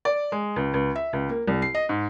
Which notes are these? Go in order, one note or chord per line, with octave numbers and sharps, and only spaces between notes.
D5
G#3
C#2
C#2
E5
C#2
A#3
C2
C7
D#5
G#2